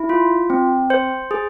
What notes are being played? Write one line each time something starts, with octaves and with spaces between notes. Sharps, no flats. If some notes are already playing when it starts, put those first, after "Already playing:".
Already playing: E4
F4
C4
C5
G#4